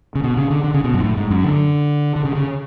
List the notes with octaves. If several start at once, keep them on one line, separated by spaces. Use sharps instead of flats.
C#3
B2
C#3
D3
D3
C#3
B2
F#2
A2
G#2
F#2
D3
D3
C#3
C#3